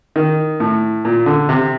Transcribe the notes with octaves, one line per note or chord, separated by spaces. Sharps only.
D#3
A2
A#2
D3
C3